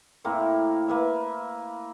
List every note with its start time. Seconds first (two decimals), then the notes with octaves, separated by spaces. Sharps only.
0.24 A2 A#3 C4 E4
0.88 A#3 B4 E5